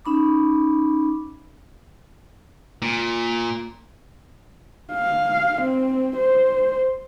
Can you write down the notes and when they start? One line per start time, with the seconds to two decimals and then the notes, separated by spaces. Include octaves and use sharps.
0.05 C#4 D#4 B5 D6
2.82 A#2
4.93 F5
5.61 C4
6.17 C5